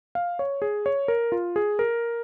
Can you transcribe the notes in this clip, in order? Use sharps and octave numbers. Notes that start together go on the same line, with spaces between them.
F5
C#5
G#4
C#5
A#4
F4
G#4
A#4